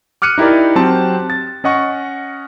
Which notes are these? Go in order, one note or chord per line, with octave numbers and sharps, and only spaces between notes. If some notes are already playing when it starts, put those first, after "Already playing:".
D6 F6 F#6 C#7 D#7
D#4 E4 G4 A#4 D5
F#3 C4 G4 A5 C6
A6
C#4 D#5 F#5 C#6